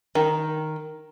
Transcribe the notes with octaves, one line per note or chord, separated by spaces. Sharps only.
D#3